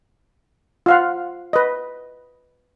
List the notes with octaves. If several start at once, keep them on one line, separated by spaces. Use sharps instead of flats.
F4 F5 F#5
B4 D#5